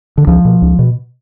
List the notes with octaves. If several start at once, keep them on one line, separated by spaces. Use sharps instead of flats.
D3
C#2 F3
B2
C#2
B2